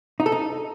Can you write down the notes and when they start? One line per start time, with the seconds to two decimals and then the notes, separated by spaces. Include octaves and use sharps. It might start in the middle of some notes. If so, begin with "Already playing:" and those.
0.20 D#4
0.26 A4
0.32 D#4